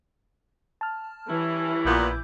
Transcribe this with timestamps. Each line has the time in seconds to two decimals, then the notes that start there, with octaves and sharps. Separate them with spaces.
0.81 A5 F6
1.29 E3 G3 C#4 E4
1.85 A#1 A#2 B3 D6 G6